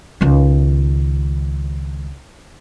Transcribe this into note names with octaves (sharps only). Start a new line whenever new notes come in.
C#2 D#3